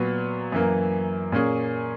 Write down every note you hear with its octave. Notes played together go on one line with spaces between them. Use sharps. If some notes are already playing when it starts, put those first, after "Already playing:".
Already playing: A#2 F#3 B3 F#4
F#2 E3 A#3
A#2 A#3 C#4 G#4